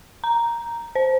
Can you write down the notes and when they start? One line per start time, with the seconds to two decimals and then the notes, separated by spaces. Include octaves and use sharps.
0.24 A#5
0.95 C5